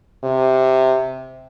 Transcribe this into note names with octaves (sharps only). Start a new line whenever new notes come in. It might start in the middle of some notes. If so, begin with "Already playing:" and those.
C3